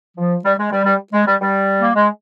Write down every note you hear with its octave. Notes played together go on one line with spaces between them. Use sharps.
F3
G3
G#3
G3
G3
G#3
G3
G3
A#3
G#3